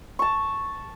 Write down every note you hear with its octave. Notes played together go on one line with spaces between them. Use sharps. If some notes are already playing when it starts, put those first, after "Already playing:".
A5 C#6